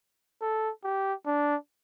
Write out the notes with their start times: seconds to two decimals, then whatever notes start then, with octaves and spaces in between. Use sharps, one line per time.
0.41 A4
0.84 G4
1.26 D4